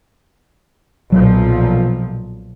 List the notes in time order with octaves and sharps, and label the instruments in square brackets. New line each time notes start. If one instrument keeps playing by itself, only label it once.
[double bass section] B1 A#2 F3 [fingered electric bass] F#3